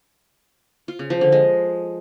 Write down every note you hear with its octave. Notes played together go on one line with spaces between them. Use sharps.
F4
C#3
F3
D3
G#3